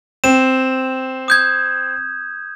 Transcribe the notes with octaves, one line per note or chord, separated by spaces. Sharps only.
C4 E7
D#6 G6 G#6